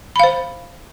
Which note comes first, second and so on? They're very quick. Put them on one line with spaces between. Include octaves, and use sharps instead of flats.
B5 F5 C5